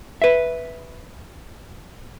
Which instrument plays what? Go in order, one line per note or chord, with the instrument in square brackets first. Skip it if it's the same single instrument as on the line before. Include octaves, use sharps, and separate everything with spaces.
[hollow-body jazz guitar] B4 E5